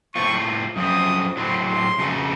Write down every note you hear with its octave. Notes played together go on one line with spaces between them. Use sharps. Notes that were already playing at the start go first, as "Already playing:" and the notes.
A2 A3 C4 F4 C#6
F#2 F3 C4 D#6
A2 F#3 C4 C6
C6
F2 C#3 A3 D#4 F#4